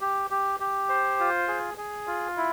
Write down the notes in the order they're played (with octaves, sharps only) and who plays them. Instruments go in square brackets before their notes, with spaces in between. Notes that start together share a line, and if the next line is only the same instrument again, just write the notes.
[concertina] G4
G4
G4
C5
F4
G#4
G#4
F4
E4